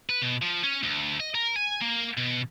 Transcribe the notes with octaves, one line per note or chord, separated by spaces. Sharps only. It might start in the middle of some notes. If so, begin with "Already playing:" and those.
B4
B2
F3
C#4
D2
D#5
A#4
G#5
A#3
B2